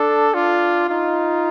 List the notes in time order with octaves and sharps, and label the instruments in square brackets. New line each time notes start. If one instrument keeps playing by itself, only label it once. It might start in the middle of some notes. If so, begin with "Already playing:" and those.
Already playing: [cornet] D4 [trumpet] A4
[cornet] D4 [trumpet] F4
[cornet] D#4 [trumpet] F4